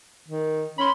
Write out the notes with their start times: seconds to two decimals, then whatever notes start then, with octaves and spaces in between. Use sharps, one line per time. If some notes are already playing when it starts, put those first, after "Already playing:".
0.29 D#3
0.78 C#4 B5 C6